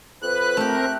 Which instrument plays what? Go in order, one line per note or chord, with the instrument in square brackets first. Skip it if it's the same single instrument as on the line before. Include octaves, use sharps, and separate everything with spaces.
[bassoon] F2 [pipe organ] B4 [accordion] F#6
[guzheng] A3 G4 [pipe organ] C4 A#4